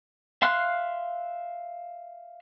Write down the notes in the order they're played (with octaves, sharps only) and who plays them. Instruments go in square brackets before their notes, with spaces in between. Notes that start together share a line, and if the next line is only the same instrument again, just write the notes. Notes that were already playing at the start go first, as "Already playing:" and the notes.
[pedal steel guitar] E5 F5 C6 F6 F#6